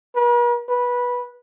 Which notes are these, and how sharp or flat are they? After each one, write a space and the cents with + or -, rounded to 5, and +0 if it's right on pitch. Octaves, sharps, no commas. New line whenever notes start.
B4 -45
B4 -15